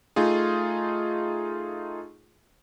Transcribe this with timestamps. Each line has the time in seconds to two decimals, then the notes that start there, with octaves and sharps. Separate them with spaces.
0.16 A3 D#4 F4 G#4